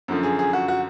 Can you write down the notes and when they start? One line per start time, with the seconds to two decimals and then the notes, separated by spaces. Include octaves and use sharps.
0.08 F#2 D3 F3
0.23 G#4
0.39 G#4
0.53 F#4
0.68 F#4